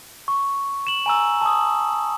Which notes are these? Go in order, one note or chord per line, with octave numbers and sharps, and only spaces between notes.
C#6
E7 F#7
G#5 A#5 E6
A5 D#6